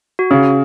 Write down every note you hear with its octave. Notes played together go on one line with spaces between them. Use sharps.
F#4
C#3 G#4